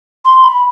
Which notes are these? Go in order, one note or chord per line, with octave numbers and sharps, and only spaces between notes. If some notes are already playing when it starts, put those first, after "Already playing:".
C6
B5